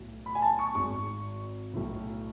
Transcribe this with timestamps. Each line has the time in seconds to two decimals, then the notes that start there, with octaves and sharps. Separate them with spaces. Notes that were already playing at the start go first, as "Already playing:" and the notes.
Already playing: B1 A2
0.26 B5
0.35 G#5
0.42 A5
0.59 C#6
0.75 G#1 G#2 C#6
1.73 B1 A2